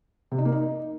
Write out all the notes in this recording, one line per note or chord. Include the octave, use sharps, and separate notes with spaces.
C3
D#4
A#3
D#4